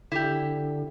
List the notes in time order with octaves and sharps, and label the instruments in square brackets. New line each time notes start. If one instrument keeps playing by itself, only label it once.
[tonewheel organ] D3 [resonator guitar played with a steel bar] E4 G4